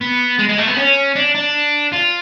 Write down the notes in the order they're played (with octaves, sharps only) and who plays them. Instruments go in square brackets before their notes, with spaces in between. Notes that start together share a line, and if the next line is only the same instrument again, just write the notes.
[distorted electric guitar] B3
G#3
G#3
A3
B3
C#4
D4
D4
F4